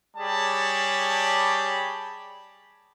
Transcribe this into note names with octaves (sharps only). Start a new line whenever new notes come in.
G3 G4 G#4 C#5 A5 B5